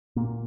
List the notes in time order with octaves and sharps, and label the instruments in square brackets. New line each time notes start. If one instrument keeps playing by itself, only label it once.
[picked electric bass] A#2 A#3